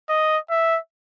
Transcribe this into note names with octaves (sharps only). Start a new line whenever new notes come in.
D#5
E5